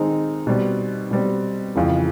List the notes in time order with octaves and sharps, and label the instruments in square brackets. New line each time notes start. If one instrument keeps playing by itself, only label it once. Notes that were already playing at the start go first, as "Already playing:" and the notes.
Already playing: [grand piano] D#3 G#3 C4 D#4
B2 G3 C4
B2 G3 C4
F2 C#3 E3 G#3